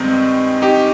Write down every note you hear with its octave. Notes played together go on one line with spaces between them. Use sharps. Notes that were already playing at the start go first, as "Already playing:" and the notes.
Already playing: G2 D#3 G#3 C4 D#4
D#4 G4